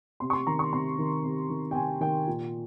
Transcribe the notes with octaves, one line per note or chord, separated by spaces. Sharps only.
C3 C6
C#6
C6
D#3 A#5
C#6
C3 C6
D#3
C3
D#3
G5
C3 G#5
D#3 G5
A#2